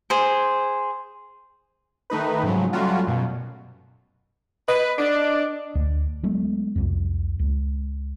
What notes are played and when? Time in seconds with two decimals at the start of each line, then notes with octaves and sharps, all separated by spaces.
0.10 G#4 C5
2.10 D#3 A3 D#4 B4
2.43 G#2 C#3 F3 F#3
2.73 F#3 G3 A3 C#4 F4 F#4
3.07 F#2 B2
4.68 B4 D#5
4.98 D4
5.75 D2
6.23 F#3 G#3 A3 B3
6.76 C2 F2
7.39 C#2